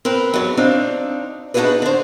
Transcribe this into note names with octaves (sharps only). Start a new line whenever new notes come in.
C4 A#4 B4
E2 A#2 F#3
C4 D4 D#4 F5
D4 D#4 F4 F#4 G#4 B4
D3 C5